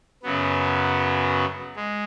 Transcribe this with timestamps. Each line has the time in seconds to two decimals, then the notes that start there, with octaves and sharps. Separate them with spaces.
0.23 F#2 C#3 F#3 B3
1.76 G#3